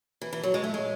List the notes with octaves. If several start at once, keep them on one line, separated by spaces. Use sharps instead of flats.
E3
E3
F#3
G#3
A3
G#3